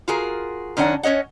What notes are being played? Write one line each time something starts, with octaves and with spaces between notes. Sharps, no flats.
F4 F#4 G#4 A#4
F#2 D#3 C#4 D4 F#5
C#4 C#5 D#5 F#5